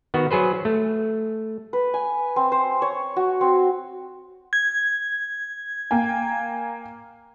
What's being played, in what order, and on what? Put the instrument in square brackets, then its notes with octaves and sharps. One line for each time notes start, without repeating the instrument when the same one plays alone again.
[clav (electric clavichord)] D#3 B3 F#4
F#3 G#4 B4 C5
A3
[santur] B4
G#5
C4
C5
C#5
F#4
C4
[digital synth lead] G#6
[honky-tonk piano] A#3 G5 G#5